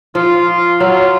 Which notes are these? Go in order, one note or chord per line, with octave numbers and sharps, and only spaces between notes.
F3 F4
F#3 F4